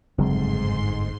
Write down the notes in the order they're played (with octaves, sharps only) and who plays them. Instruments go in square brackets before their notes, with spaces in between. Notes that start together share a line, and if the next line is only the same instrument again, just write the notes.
[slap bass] G1 F2 [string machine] G#2 C6 [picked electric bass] C#3 F#3 C4 [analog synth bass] G#3